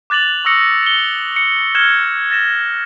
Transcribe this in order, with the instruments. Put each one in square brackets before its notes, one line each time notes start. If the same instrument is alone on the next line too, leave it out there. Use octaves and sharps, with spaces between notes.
[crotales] D6 F#6 A6 F7 F#7
C#6 D#6 E6 A#6 C#7
C#7 G7
C#7
F6 F#6 G#6 C#7 E7 G7
A6 A#6 E7